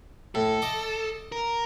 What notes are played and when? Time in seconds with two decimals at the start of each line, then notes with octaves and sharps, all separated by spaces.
0.35 A2 A4
0.62 D#5 D6
1.32 A#4